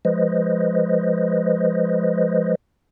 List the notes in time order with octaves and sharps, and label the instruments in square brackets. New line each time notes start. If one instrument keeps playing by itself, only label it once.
[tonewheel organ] F3 G#3 B4 C5 D#5